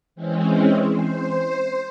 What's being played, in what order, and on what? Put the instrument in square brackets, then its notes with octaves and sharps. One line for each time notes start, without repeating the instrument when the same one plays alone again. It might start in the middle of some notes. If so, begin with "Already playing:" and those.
[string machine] E3 G#3 C4 C#4
C5